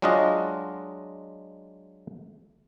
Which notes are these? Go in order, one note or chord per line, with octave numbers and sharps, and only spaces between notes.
F#3 G#3 D4 F4 F#4 D#5